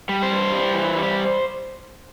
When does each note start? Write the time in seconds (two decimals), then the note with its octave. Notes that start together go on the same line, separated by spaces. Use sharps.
0.09 G3
0.23 C5
0.31 G2
0.52 G3
0.74 E3
0.96 G3